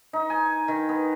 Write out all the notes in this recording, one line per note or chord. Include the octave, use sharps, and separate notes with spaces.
D#4
G#5
D#3
B3